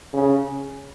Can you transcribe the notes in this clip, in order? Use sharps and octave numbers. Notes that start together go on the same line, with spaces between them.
C#3